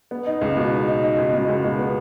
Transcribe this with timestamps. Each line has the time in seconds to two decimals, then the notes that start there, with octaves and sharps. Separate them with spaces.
0.11 B3
0.26 D#4
0.41 C#2
0.57 B2
0.72 D#4
0.87 D#4
1.03 D#4
1.18 C#2
1.34 B2
1.49 C#2
1.64 B2
1.79 B3